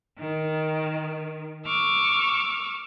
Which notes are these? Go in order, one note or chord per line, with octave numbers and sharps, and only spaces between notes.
D#3
C#6 D6 E6 F6